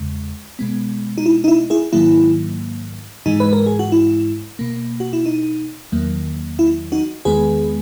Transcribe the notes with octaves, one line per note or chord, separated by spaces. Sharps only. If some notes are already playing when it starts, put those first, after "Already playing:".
Already playing: E2 C#3 G#3
B2 G#3 B3
D#4
E4
D#4
E4
E4 G#4
G#2 D#3 F#3 A#3 E4
G#2 E3 G#3 D#4
B4
A#4
G#4
F#4
E4
B2 A#3
F#4
E4
D#4
E2 D#3 F#3 A#3
E4
D#4 F#4
E2 D#3 G#3 B3 G#4 B4